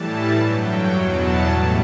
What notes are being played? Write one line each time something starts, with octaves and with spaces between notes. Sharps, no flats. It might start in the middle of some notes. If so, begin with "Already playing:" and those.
Already playing: A2 E3 G3 A5
G2 F#3
G5
E2 B2 F#3
A5
A2 G3